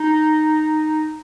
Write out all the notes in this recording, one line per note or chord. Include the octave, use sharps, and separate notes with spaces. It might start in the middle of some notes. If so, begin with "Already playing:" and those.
Already playing: D#4